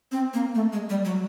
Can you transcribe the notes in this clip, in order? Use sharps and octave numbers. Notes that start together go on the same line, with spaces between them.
C4
A#3
A3
G#3
G3
F#3